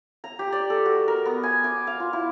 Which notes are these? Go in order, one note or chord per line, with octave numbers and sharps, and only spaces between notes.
A#5
G4
D5
A4
F#4
A#4
B3
G#5
D6
F5
F4
E4